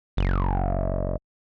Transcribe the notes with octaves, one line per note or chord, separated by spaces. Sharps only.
F#1